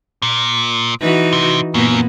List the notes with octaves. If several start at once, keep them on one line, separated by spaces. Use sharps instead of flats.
A#2
E3 D#4 F#4
C3
F#2 A#2 A#3 B3